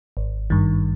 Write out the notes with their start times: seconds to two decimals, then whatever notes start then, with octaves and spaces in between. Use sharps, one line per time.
0.17 G#1
0.50 G2 D#3